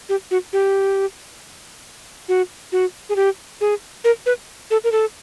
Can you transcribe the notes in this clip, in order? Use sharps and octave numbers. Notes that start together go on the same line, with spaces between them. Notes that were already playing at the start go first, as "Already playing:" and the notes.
G4
F#4
G4
F#4
F#4
G#4
G4
G#4
A#4
B4
A4
A#4
A4